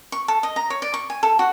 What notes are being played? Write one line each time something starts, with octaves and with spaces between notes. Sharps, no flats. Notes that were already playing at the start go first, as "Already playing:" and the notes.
C#6
A4
D#5
A#5
C#5
D5
C#6
G#5
A4
F#4